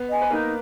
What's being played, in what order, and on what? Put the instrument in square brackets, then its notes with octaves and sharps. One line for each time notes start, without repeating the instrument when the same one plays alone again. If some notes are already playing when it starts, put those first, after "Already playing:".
Already playing: [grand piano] B3 B4
[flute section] D#5 G#5
[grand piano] B4
[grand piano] A#3 A#4 [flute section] D#4